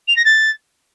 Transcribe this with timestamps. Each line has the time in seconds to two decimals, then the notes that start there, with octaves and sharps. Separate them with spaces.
0.08 F7
0.16 A#6
0.25 A6